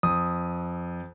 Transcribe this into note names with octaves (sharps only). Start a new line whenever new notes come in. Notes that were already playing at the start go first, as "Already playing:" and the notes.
F2 D#6